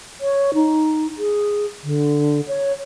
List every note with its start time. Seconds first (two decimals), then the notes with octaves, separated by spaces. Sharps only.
0.21 C#5
0.54 D#4
1.18 G#4
1.84 D3
2.48 C#5